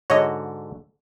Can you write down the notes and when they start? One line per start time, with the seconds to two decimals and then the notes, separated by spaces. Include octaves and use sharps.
0.10 G#2 D3 F#4 C#5 D#5